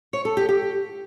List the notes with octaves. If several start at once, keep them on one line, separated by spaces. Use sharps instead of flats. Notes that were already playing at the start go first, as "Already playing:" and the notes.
C#5
A4
G4
G4